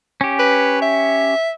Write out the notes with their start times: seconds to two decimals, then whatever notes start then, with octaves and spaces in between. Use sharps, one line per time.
0.21 C#4 G4
0.39 B4
0.82 E5